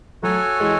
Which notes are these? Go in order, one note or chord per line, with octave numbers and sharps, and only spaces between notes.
F#3 A3 F#4 A4 C#5 G#5
E3 G#3